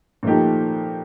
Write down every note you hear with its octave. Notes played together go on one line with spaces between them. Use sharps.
A#2 F3 A3 D#4 G4